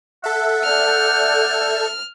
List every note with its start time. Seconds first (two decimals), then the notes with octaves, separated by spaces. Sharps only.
0.24 A4 E5 F#5
0.64 D5 F6 G6